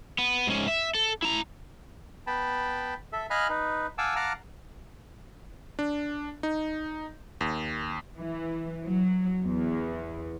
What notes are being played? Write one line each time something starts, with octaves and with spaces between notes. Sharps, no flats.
B3
G#2 C#4
E5
A4
E4 A#5
B3 G5 A5 B5
A4 E5
D#5 F5 G#5 B5 F6 F#6
D#4 B4
F5 F#5 G#5 A5 D6 E6
F5 F#5 A5 A#5 D6 F6
D4
D#4
D#2
E3
F#3
E2